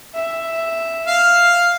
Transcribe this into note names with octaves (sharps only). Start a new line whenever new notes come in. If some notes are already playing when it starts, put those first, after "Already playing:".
E5
F5